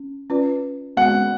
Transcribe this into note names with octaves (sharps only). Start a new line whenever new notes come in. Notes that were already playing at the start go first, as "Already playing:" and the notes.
Already playing: C#4
C#4 F4 B4 D5
G#3 B3 F#4 F#5